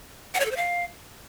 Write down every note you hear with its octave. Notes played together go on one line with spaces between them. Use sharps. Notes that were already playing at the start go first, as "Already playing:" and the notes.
F#5
C#5
A4
C5
F5